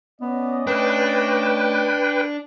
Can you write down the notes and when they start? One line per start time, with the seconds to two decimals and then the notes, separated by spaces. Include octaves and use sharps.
0.21 B3 C#4 D5 D#5
0.67 A3 D4 B4 G5